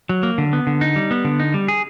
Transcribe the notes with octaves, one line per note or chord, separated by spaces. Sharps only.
F#3
A#3
D3
B3
D3
D#4
G3
B3
D3
D#4
G3
G#4